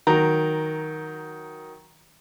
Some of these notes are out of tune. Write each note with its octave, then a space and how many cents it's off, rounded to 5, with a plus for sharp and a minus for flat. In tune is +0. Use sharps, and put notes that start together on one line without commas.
D#3 +5 F#3 +0 A#5 +0